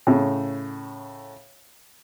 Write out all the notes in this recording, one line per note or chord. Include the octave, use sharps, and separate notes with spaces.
A2 C#3